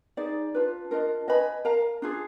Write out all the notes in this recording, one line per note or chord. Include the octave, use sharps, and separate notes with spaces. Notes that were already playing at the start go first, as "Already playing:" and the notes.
D#4 G#4 D5
D4 F4 B4
D4 F4 A#4 D#5
B4 D#5 G#5 B5
A#4 F5 A#5
D4 F4 G#4